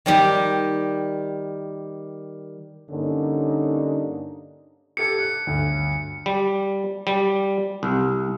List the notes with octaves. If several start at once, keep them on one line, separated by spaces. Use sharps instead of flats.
D#3 G3 G4
G2 D3 A#3 C#4 D#4
G4 A4 G#6 C#7
F#6
G1 D2
G3
G3
C2